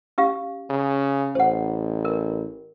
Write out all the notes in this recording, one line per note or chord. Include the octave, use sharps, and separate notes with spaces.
C#4 G4 F5
C#3
A1 C5 F#5
A#4